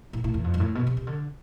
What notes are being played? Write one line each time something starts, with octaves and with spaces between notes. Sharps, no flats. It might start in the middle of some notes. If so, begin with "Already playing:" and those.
A2
A2
E2
F2
G2
A2
B2
C3
C3
D3